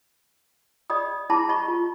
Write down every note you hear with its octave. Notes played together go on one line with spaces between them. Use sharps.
D5 D#5 B5 D#6
E4 A5 B5 D6
D#5 B5 C#6
F4